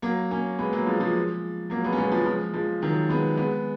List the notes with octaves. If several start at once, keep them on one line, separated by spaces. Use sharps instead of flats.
F#3 A#3
A#3 C#4
G#3 B3
F#3 A#3
F3 G#3
F3 G#3
F#3 A#3
G#3 B3
C#4
G#3 B3
F3 G#3
F3 G#3
F3 G#3
D#3 F#3
G#3 B3
G#3 B3